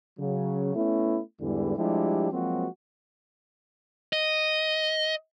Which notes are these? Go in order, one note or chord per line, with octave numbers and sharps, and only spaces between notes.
C#3 F#3
A3 B3 C#4 E4
E2 G#2 D3 E3 G3
F3 G3 G#3 D4 E4 G4
F3 F#3 G#3 A#3 C4 F#4
D#5